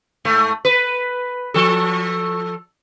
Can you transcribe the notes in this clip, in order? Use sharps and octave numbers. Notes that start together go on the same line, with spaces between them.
G#2 A3
B4
F3 A4